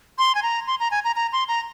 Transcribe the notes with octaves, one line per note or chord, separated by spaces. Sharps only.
C6
G#5
A#5
C6
A#5
G#5
A#5
A#5
C6
A#5